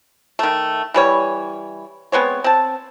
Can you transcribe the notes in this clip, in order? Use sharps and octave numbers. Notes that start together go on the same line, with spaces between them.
D#3 A3
E3 G3 C#5
G#3 B3 C4 C#5
C4 A5